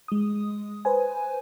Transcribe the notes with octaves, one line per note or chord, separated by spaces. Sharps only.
G#3 D#6
B4 C5 G#5